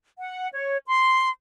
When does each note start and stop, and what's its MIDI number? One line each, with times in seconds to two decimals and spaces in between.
0.18 0.48 78
0.53 0.78 73
0.87 1.29 84